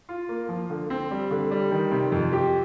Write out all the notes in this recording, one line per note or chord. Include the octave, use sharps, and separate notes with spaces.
F4
A#3
F3
D3
C4
G3
D3
G3
D#3
C3
F2
G4